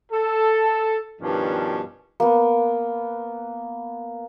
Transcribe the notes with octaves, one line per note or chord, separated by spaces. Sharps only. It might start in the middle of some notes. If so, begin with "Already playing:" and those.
A4
G2 B2 D#3 F3 C#4 D4
A#3 B3